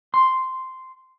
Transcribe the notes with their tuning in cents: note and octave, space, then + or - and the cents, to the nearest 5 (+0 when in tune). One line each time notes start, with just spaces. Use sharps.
C6 -5